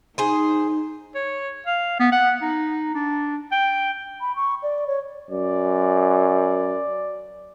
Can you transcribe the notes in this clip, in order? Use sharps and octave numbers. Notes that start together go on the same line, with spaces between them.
D#4 G#4 C5
C#5
F5
B3
F#5
D#4
D4
G5
B5
C#6
D5
C#5
F#2 D5